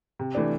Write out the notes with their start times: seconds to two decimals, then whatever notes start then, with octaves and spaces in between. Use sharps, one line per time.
0.19 C3
0.35 E3 A3 D4